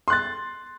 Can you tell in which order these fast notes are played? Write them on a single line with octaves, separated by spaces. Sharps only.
C6 F#6 A6